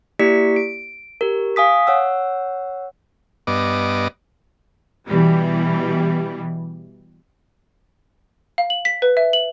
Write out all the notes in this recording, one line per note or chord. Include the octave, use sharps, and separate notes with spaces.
A#3 E4 G4 D5 B6 C#7
D7
G4 A#4
F5 G#5 D#6 B6
C#5 F#5 E6
G2 B3 D#5 D6
B2 E3 G3
F5
F#7
B6
B4
E5
F#7